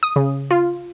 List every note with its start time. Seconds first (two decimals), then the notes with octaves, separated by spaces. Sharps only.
0.03 D#6
0.16 C#3
0.51 F4